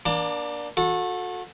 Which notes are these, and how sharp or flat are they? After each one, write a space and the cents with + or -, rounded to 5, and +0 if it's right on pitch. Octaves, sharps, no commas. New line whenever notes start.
A#3 +35 D4 +0 A5 +35
F#4 -35 A4 +0